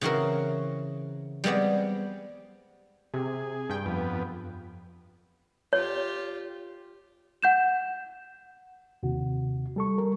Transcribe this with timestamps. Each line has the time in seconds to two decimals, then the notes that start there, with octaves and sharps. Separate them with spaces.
0.01 C#3 E3 C4 F#4 A#4
1.44 G3 G#3 B3 C4 D5
3.14 C3 G#4
3.69 G2 G5
3.86 F2 B3
5.73 F4 G4 C#5
7.42 F#5 G6 E7
9.03 D#2 C3 F#4
9.76 G3 A4 C#6
9.98 G3 A#4